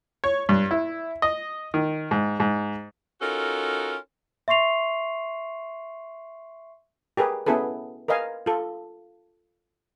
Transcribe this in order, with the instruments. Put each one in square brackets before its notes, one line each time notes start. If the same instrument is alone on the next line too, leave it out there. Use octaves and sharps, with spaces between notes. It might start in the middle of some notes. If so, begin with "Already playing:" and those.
[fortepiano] C#5
G2
E4
D#5
D#3
G#2
G#2
[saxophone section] C#4 D#4 F4 F#4 A4 A#4
[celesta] E5 C6 C#6 C7 F7
[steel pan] G4 G#4 A#4 B4
B3 C#4 E4 G#4 A4 B4
A#4 B4 D#5 F5 G#5
F4 A4